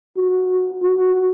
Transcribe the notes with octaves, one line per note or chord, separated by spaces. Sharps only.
F#4
F#4